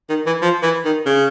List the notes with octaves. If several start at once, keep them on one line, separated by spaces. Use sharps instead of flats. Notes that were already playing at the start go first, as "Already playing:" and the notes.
D#3
E3
F3
E3
D#3
C#3